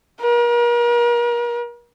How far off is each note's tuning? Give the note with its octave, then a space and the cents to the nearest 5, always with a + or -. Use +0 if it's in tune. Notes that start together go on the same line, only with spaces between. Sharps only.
A#4 +40